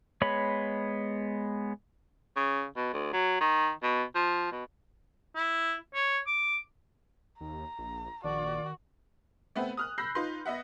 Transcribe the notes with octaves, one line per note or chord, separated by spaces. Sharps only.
G#3 B3 C#5 B5
C#3
B2
D2
F#3
D#3
B2
F3
B2
E4
C#5
D6
D#2 A#5
A#1
A#1 D#3 F#4 D5
A3 B3 C4
D#6 F6 F#6
B5 E6 F#6 G6 A#6 C7
D#4 F4 B4 C6
B3 D#5 E5 F#5